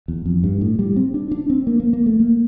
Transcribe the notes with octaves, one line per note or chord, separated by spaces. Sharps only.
E2
F2
G2
A2
G3
C4
D4
D4
C4
A#3
A#3
A#3
A3
A#3